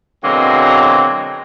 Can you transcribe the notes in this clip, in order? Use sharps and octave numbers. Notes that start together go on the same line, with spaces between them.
B2 D3 F#3 G#3 A#3 C4